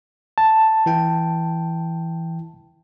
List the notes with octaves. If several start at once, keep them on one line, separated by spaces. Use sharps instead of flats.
A5
E3 E4 G5